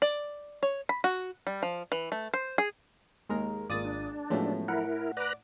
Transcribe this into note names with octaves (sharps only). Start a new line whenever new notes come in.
D5
C#5
B5
F#4
G3
F3
E3
A3
C5
G#4
D#2 G#3 A#4
G#1 G#3 A#3 F4 D5 D#6 A6
D4
A2 F3 F#3 G#3 A3 B3 C#4
E4 A#4 F#5
B4 D5 A#5 D6 F#6